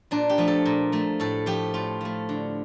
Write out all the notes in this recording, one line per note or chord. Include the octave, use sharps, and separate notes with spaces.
A#2 D4
G4
F3 A3
A4
A#2
F3 A3
A2 A4
F3 A3 G4
A2 F4
F3 A3
D3